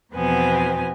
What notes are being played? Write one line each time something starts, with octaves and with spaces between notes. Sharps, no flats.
E2 B2 F3 B3 C4 G#5